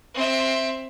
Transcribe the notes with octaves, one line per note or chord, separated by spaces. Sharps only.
C4 E5